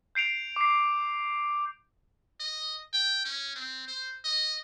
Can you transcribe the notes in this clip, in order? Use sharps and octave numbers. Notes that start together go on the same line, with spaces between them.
G6 C7 D7 F7
D6 C7
D#5
G5
C#4
C4
C5
D#5